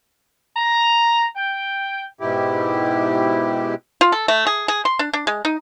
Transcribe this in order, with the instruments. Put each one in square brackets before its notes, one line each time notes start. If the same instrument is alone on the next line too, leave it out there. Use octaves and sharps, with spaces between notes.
[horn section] A#5
G5
[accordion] G#2 B2 E4 G4
[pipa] F4
A4
A3
G#4
G#4
C6
D4
D4
G#3
D#4